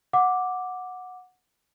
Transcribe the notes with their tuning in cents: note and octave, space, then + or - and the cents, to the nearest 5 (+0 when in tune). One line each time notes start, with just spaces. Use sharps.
F#5 -10 D6 +0